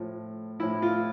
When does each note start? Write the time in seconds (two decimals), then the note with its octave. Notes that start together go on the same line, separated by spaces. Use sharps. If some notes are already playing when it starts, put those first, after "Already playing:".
Already playing: A2 F3
0.60 A2 F3 E4
0.82 F4